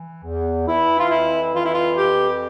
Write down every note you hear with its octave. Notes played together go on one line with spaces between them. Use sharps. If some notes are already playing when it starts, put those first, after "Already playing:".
Already playing: E3
E2
E3 E4
F4
F2 E4
E3 F4
E4
F4
F2 G4